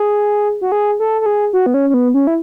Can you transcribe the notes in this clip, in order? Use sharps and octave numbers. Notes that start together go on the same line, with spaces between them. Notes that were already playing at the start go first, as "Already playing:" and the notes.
Already playing: G#4
F#4
G#4
A4
A4
G#4
F#4
B3
C#4
C#4
B3
C#4
E4